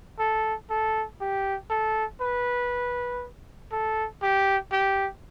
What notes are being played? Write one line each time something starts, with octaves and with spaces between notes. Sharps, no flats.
A4
A4
G4
A4
B4
A4
G4
G4